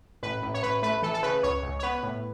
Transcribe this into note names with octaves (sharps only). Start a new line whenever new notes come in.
A1 B4
A1
C#5
A1 B4
A3 B4
E3 A4
A4
C#3 B4
C#2 C#5
C#2
C#5
B3 B4
A2